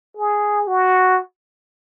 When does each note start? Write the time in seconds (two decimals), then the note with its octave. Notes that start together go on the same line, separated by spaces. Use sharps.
0.17 G#4
0.67 F#4